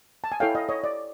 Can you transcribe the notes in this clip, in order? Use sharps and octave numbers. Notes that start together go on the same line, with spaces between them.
A5
G#5
E4 A4 C#5 F5 G5
D#5 F5
C#5 D#5
D5